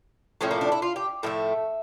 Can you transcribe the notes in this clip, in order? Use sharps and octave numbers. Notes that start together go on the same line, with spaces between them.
A2 F3 A3 C#4
A#3
D4
E4
F4
G4
A2 F3 A3 E5